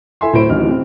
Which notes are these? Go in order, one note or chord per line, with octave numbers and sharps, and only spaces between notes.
E4 A4 E5 G#5 C6
D1 A2 E4 C5 D7
D1 A1 D#4 F6
C4